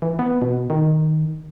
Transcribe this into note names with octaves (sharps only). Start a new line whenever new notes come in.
E3
B3
B2
D#3